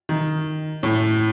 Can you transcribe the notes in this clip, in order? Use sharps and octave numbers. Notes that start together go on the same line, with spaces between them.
D#3
A2